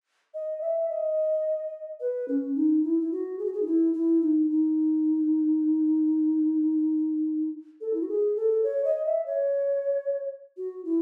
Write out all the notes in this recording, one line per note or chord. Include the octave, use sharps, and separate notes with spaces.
D#5
E5
D#5
B4
C#4
D#4
E4
E4
F#4
G#4
F#4
G#4
D#4
E4
E4
D#4
D#4
A4
E4
F#4
G#4
A4
C#5
D#5
E5
C#5
F#4
E4